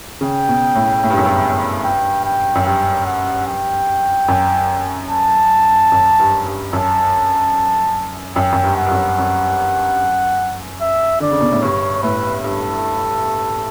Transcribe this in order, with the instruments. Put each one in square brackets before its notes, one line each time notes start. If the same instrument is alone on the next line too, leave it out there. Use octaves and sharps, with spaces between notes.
[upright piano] C#3 [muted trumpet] G5
[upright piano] B2
A2
A2
G2
F#2
G2
[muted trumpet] G5
G5
[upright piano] F#2
[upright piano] G2 [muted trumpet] G5
[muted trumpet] F#5
G5
[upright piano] F#2
[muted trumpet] A5
[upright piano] F#2
G2
G2
[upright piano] F#2 [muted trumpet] A5
[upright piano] F#2 [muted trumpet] G5
[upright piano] F#2
G2
[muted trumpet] F#5
[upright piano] G2
F#2
F#2
[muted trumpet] E5
[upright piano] D3 [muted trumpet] D5
[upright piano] C#3
B2
A2
[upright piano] G2 [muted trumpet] C#5
[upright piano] A2 [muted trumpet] B4
[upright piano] G2 [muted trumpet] A4